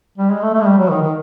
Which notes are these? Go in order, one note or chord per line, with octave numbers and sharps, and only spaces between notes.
G3
G#3
A3
A3
G#3
G3
F#3
D#3
D#3